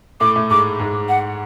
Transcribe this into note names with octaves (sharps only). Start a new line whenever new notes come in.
A2 A3 D6
A2 A3
G#2 G#3 D6
G#2 G#3
F#5